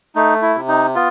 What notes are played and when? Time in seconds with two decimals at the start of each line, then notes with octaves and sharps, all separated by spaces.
0.15 A3 D#4
0.42 E4
0.55 C3
0.68 D#4
0.95 B3 F4